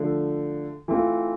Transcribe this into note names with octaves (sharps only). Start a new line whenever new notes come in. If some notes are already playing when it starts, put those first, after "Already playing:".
Already playing: D3 F3 A3
E3 A3 C4 F4